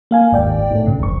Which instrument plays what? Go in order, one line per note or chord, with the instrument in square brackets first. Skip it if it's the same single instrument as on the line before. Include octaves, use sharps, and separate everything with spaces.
[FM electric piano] A#3 F5 G#5
[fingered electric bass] G1 D#2 [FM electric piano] G#2 D5 G5
[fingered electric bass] B1 A2
[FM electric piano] G2 C#3
[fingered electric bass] F1 [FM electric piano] B1 C#6